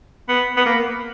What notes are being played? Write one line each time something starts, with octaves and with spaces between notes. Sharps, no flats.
B3
B3
A#3